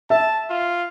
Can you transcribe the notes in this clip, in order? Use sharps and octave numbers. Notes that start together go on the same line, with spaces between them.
E5 A5
F4